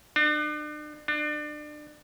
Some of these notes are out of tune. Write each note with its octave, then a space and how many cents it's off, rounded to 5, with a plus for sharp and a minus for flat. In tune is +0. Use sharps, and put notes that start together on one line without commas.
D4 +40
D4 +30